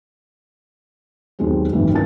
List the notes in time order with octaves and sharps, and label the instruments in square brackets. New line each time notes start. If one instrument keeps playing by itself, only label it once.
[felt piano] D#2 D#3 F#3 G#3 B3 C4
F#1 C2 G#2 C3 D#3 E3
E3 C#4 F4 A#4 A5 A6